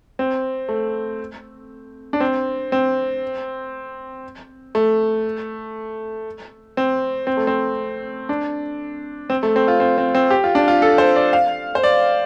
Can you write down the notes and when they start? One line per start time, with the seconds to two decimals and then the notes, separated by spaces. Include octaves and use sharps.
0.19 C4
0.69 A3
2.13 D4
2.20 C4
2.72 C4
4.75 A3
6.77 C4
7.27 C4
7.37 A3
7.47 C4
8.29 D4
9.30 C4
9.43 A3
9.56 C4
9.68 F4
9.80 C4
9.98 C4
10.15 C4
10.31 G4
10.44 F4
10.55 D4
10.68 F4
10.82 A4
10.98 C5
11.16 D5
11.33 F5
11.75 C5
11.83 D5